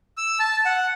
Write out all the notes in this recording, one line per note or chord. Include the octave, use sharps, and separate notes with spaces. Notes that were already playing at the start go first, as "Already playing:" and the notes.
E6
A5
F#5